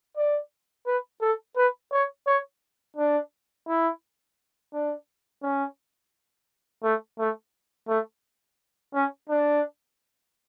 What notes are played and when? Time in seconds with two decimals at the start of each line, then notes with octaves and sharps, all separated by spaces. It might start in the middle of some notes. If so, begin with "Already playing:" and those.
0.17 D5
0.86 B4
1.21 A4
1.56 B4
1.92 C#5
2.27 C#5
2.97 D4
3.68 E4
4.73 D4
5.43 C#4
6.83 A3
7.19 A3
7.88 A3
8.94 C#4
9.29 D4